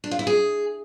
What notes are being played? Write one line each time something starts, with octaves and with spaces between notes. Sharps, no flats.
D4
F4
E4
G#4